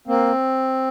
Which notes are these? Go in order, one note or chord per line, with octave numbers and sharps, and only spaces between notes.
A#3 C4